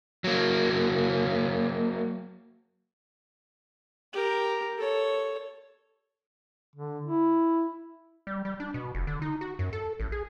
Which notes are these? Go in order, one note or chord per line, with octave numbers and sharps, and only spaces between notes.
F#3 A#3
G4 A#4
A4 C#5
D3
E4
G3
G3
D4
B2
F1
D3
D#4
F#4
F#2
A4
A1
G#4